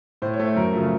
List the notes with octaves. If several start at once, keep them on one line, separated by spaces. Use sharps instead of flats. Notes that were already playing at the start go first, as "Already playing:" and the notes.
A2 C5
C#5
A3 C5
F#2 A#4
C#3 F3 A3